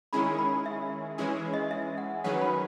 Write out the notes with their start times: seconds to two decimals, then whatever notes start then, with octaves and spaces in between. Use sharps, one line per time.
0.13 D#3 G#3 C#4 E4 G#4 B5
0.39 B5
0.66 E5
1.18 E3 G#3 C#4 E4 G#4
1.54 D#5
1.71 E5
1.98 F#5
2.24 D#3 F#3 C#4 G#4 B4 F#5
2.41 B5